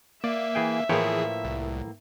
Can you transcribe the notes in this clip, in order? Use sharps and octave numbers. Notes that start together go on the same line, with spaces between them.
A#3 D5 E5
E3 G#4 G5
A2 E3 F3 A#3 G#4 B4 C#5 G5
C2